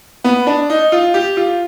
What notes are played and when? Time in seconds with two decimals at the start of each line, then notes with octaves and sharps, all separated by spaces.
0.24 B3
0.47 D4
0.70 D#4
0.92 F4
1.14 G4
1.37 F4